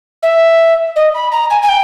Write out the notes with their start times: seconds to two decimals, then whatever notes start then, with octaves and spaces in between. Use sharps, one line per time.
0.23 E5
0.96 D#5
1.15 B5
1.32 A#5
1.50 G#5
1.62 G#5
1.69 G5